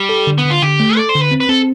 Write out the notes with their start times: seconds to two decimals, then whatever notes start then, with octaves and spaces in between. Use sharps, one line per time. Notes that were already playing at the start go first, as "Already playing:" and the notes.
Already playing: G3
0.09 A4
0.27 D3
0.38 B3
0.45 D3
0.50 F4
0.62 D3 G4
0.80 A3
0.97 A4 D5
1.09 C5
1.15 D3
1.21 B4
1.31 C4
1.40 B4
1.49 C4 A4